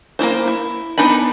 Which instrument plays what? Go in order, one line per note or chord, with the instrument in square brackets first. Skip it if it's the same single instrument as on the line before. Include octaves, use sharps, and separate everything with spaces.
[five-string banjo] A#3 C4 E4 C5
E4
B3 D4 D#4 G#5 B5